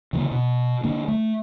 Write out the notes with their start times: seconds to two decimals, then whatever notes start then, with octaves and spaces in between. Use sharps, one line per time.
0.13 C#3 E3 G3 A#3
0.31 B2
0.83 D3 A#3 D4
1.08 A3